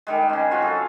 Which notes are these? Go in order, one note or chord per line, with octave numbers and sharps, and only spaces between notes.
D#3 G3 G#3
C#3 C4
F#3 F4 A#5
G#4 A4